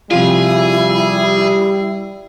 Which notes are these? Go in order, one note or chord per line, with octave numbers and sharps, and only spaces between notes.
C3 F3 G3 E4 F4 G#4